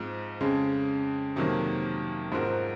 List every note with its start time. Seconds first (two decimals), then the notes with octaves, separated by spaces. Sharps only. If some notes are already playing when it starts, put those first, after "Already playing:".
Already playing: G#2 F3 C4
0.40 F2 C#3 G#3
1.36 F2 C3 D#3 F#3 A#3
2.32 G#2 F3 C4 F#4 A#4